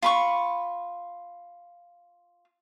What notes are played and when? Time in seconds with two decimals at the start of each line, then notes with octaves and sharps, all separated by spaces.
0.02 F4 B5 C#6